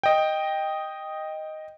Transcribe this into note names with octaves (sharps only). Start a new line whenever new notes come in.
D#5 G5